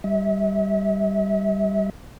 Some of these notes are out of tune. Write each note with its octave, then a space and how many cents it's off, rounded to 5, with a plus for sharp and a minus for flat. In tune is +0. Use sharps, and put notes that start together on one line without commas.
G3 +0 E5 -35